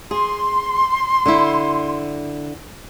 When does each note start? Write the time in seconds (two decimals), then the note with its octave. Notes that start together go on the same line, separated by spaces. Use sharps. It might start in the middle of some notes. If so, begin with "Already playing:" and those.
0.11 G#4 C6
1.26 D3 E4